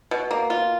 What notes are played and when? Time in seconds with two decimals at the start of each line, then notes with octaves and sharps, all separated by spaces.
0.11 B2
0.31 A#3
0.50 F4